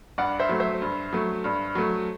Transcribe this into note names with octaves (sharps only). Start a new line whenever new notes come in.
G2 D5 F#5
C5 E5
F#3 A3
C5 E5
G2
F#3 A3
G2
F#3 A3